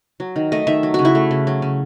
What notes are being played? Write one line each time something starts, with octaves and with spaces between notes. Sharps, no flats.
F#3
D#3
A3 D#5
D#3 E5
F#3
C#3 F#4
E4
A3
C#3
F#3
C#3